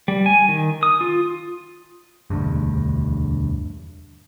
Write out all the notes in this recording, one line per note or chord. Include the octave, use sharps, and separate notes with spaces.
G3
G#5
D#3
D#6
F4
E1 D2 G2